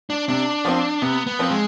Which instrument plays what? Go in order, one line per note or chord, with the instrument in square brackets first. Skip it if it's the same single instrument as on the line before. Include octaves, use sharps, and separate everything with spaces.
[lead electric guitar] D4
[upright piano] C3 [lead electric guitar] D4
[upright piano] F3 C4
[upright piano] C3 [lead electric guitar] B3
[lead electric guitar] B3
[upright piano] F3 C4
[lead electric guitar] G#3